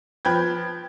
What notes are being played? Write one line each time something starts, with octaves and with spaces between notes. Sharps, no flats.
F3 B4 G5 G#6